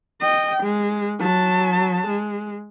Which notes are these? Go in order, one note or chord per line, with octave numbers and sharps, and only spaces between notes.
D#5 G5
G#3
F#3 A5
G#3